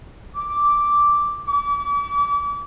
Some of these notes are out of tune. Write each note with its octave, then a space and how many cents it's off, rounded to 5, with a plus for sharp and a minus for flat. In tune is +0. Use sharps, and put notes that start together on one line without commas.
D6 -5
D6 -45